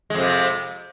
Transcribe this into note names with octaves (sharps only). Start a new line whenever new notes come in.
F2 C3 G#3